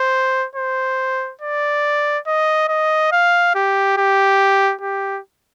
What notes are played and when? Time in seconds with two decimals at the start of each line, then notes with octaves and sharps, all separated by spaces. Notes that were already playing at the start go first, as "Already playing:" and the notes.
Already playing: C5
0.56 C5
1.42 D5
2.27 D#5
2.69 D#5
3.12 F5
3.55 G4
3.97 G4
4.82 G4